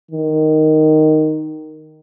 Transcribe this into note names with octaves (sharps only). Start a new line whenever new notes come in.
D#3